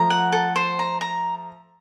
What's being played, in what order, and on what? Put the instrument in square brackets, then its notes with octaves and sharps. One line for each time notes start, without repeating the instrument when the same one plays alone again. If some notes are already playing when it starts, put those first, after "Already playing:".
Already playing: [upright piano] F3 A3 [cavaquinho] A#5
[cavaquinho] F#5
A4
C5
A#5
A#5